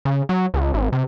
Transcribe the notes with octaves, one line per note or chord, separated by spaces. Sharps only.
C#3
F#3
C#2
G#1
C3